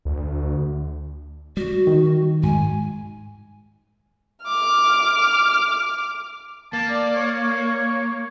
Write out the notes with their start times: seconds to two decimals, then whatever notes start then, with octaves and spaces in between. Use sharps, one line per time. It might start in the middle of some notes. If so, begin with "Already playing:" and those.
0.05 D2
1.57 G3 F#4
1.87 D#3
2.43 G#2 G#5
4.44 D6 F6
6.73 A#3 A5
6.90 D5
7.16 C#5